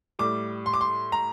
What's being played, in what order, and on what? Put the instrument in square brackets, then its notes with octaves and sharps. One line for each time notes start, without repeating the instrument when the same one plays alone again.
[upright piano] A2 G3 D6
C6
D6
C6
A#5